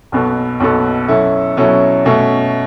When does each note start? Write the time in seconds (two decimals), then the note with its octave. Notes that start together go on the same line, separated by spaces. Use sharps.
0.12 B1 B2 B3 A4
0.60 B1 B2 B3 A4
1.08 B2 F#3 C#4 E4 A4
1.57 B2 F#3 C#4 E4 A4
2.05 B2 A3 C#4